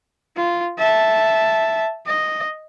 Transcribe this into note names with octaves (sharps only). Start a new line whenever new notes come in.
F4
E5 A5
D#5